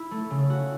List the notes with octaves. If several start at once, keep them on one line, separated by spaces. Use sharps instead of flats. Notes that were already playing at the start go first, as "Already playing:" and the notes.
Already playing: E4
A3
C#3
F#4